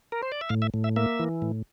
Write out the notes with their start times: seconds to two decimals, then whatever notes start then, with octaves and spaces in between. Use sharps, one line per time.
0.12 A#4
0.22 C5
0.32 D5
0.41 E5
0.49 A2 F5
0.62 E5
0.74 A2
0.84 E5
0.96 A#3 E5
1.19 E3
1.42 A2